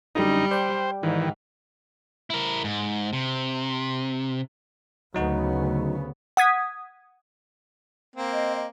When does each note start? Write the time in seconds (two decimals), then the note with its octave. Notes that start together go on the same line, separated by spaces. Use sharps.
0.15 F#2 D3 G3 D#4
0.51 C5 D5 G5
1.03 G#2 D#3 E3
2.30 E4 A#4
2.64 G#2
3.13 C3
5.14 D2 C#3 F#3 B3 D#4 F#4
6.37 F#5 D#6 G#6 B6
8.16 A#3 C4
8.32 D#5
8.55 D#5